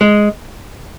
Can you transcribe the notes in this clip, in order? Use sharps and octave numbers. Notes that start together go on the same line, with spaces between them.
G#3